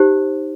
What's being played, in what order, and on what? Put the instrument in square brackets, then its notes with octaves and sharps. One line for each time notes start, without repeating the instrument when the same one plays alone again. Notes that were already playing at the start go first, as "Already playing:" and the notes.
Already playing: [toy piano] D#4 G4 C5